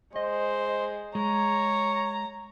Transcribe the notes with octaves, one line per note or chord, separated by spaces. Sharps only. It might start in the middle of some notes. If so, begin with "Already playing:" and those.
G#3 C5 D#5
G#3 G#4 C#5 A#5